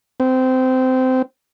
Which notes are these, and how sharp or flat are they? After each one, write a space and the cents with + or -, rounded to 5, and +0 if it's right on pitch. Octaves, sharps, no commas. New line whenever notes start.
C4 -20